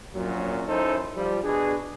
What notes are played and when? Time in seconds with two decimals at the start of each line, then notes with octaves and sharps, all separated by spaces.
0.14 A#1 F#2 A#2 F#3
0.68 F#2 D#4 E4 A4 C5
1.15 F3 G3
1.44 B2 D4 G#4